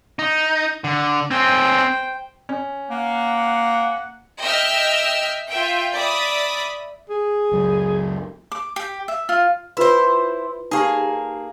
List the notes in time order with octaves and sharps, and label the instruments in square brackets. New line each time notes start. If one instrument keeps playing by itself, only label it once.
[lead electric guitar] D#4
D3
[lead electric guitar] C4 C#4 [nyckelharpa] C5 G5
[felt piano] C#4
[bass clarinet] A#3 [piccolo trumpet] F#5
[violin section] D#5 E5 G5 E6 F6
F4 E5 G5
D5 E5 B5 D#6
[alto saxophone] G#4
[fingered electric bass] C#2 F#2 F#3
[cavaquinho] D6
G4
E5
F4
[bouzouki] E4 C5 [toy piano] F4 B4 C6
[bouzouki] A#3 G#4 [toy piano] D#4 G4 A5